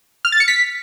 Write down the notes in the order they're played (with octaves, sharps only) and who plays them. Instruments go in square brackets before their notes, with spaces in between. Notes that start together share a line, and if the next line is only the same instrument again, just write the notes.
[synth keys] F6
A6
C#7
B6